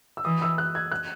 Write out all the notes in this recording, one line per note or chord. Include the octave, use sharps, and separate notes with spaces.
E6
E3 D#6
E6
F#6
G#6
F#6